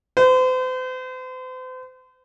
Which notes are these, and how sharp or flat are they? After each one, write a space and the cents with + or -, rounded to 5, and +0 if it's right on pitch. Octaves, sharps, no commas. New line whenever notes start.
C5 -40